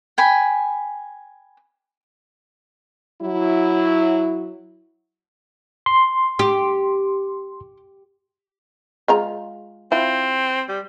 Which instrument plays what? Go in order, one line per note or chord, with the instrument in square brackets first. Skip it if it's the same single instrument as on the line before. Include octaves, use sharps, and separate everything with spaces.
[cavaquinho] G5 G#5 B5
[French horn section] F#3 E4
[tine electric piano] C6
[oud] G4
[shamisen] G#3 F4 A#5
[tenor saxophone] C4 [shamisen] E4 F4
[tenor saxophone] G3